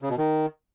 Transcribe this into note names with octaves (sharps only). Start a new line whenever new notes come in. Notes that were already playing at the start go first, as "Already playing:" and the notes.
C#3
B2
D#3